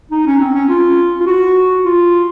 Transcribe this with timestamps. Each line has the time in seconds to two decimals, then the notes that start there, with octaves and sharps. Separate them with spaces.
0.11 D#4
0.26 C#4
0.40 C4
0.55 C#4
0.69 F4
1.20 F4
1.27 F#4
1.85 F4